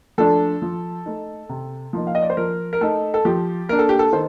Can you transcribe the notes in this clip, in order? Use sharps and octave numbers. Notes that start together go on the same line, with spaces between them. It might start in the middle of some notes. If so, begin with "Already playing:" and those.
F3 A3 D4 A4
F3
A3 D#4
C3
F3 A#3 D#4
F5
D#5
D5
C5
F3 A#4
A#4
A3 D#4 A4
A4
F3 G4
A#3 D4 A#4
A4
G4
A4
D#3 C5